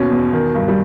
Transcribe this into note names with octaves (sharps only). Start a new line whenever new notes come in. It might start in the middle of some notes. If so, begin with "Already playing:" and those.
Already playing: D#2 B2 C#4
E2
D#3
G2
G3